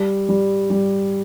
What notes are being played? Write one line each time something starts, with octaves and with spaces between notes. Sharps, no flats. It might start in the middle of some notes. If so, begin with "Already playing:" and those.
Already playing: G3
G3
G3